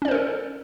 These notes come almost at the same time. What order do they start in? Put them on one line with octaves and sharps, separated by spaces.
C#4 D5 C5 A#4 A4